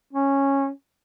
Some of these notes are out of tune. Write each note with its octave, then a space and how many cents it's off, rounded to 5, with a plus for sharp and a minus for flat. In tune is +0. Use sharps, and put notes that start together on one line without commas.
C#4 -10